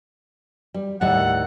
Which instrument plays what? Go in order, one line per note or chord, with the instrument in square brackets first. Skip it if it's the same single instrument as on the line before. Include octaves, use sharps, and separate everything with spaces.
[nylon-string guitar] G3
[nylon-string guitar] D#2 A2 G3 [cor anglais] F#5